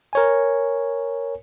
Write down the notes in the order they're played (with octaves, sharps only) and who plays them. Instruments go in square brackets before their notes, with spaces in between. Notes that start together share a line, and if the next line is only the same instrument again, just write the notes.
[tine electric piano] A#4 C#5 G#5